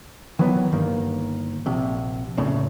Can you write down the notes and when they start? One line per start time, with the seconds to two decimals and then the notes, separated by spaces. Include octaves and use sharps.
0.39 D#3 E3 F#3 B3
0.72 G1 G2 D#3 A#3
1.66 A#1 C3
2.37 F1 C2 A2 C#3